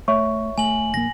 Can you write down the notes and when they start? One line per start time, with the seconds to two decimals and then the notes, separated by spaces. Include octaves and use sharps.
0.08 A3 C#5 E5 C#6
0.58 A3 G#5 F#7
0.94 A#1 A#3 A#6